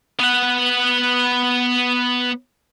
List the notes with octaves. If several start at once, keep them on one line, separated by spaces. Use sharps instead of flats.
B3 F#5